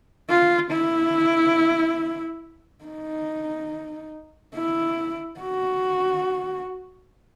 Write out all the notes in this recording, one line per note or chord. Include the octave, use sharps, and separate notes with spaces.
F4
E4
D#4
E4
F#4